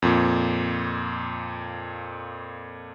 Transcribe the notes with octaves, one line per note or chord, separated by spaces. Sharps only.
F2 A#2